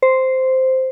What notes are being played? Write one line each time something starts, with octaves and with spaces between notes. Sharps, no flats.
C5